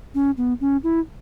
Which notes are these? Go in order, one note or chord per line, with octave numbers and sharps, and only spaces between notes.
C#4
B3
C#4
E4